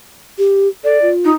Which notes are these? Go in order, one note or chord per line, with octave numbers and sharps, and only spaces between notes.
G4
A4 D5
F4
D#4